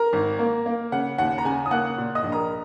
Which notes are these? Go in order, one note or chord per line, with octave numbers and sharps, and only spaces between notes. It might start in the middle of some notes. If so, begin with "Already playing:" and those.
Already playing: A#4 A#5
G#1
A#3
A#3
C#3 F#5
D#2 F#5
A#5
C#3 G#5
D#6
A#3 F#5 F#6
A#2
D#5 D#6
A#1
A#4 A#5